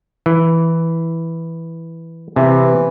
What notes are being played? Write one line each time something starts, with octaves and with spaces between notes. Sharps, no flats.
E3
C3 E3